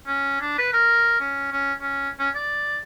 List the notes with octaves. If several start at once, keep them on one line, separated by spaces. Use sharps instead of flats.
C#4
D4
B4
A#4
C#4
C#4
C#4
C#4
D5